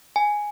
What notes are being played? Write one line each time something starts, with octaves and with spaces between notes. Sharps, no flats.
G#5